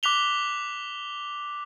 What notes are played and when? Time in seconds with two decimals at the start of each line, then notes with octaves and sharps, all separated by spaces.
0.03 D6 F#6 B6 F7 G7